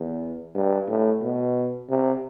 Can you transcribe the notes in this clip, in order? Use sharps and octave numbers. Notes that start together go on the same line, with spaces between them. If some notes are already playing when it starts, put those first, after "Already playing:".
Already playing: E2
G2
A2
B2
C3